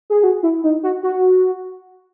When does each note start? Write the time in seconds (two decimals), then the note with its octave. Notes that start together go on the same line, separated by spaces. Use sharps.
0.10 G#4
0.24 F#4
0.43 E4
0.64 D#4
0.83 F#4
1.03 F#4